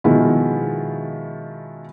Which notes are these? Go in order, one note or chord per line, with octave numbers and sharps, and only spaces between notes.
B2 D#3 F3 G#3 B3 E4